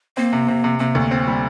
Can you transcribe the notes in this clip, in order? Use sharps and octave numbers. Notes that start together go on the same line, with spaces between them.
A#3 C4
C3
C3
C3
C3 A#3
D2
C4
G3